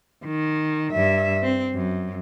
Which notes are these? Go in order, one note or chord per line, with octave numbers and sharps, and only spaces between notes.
D#3
G2 E5
C4
F#2